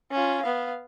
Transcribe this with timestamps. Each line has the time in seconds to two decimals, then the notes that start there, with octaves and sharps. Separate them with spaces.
0.11 C#4 F4
0.42 B3 F5